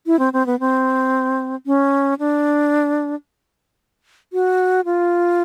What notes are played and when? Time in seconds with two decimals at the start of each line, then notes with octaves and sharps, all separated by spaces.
0.06 E4
0.19 C4
0.33 C4
0.46 B3
0.60 C4
1.66 C#4
2.19 D4
4.33 F#4
4.85 F4